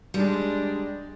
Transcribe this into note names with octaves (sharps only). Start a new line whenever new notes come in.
G3 G#3 D4